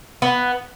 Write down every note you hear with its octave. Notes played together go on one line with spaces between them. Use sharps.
B3